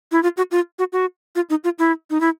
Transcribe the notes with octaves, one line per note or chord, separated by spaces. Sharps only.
E4
F4
F#4
F4
F#4
F#4
F4
D#4
F4
E4
D#4
E4